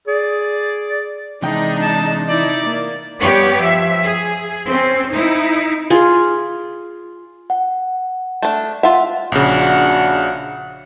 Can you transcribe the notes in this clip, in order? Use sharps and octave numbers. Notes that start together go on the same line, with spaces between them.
G#4 D5
C3 E3 G#3 D4 D#4 G5
A5
D#4 E4 D5
A#3
G3 B3 G4 C#5
F3 E5
G#4
C4 C#4
D#4 E4
F4 G#4
F#5
A3 D4
F4 E5 F#5
A#1 C#3 D4 F#4 F#5